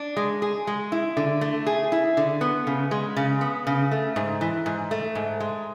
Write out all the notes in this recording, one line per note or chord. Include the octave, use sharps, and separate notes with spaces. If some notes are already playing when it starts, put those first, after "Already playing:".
Already playing: D4
G#3
G#4
G#3
E4
D3
A3
G#4
E4
D3
B3
C#3
G#3
C#3
B3
C#3
A3
G#2
E3
G#2
A3
G#2
G#3